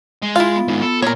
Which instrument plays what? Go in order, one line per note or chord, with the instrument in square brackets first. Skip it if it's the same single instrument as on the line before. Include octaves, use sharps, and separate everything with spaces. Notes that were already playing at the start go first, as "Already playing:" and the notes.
[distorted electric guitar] G#3
[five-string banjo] E4 F5 [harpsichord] F4
[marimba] B3
[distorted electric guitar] G#2 D#3
[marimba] B3 [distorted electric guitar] A4
[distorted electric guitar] A#2 [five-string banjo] A#4 C#5